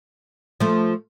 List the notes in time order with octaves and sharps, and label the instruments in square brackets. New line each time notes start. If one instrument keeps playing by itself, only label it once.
[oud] F3 A3